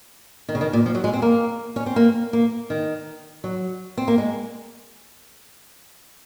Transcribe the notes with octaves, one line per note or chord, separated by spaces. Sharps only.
D#3
C#3
D#3
A#2
F3
F#3
G#3
C4
A#3
C#4
C4
A#3
A#3
D#3
F#3
C4
A#3
G#3